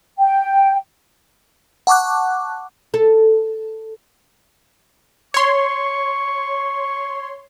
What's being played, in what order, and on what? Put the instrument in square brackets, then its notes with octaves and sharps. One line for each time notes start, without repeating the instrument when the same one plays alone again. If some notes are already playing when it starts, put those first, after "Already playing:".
[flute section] G5
[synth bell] F#5 A5 C#6 D6 F#6
[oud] A4
[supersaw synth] C#5 C6 [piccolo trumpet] C#6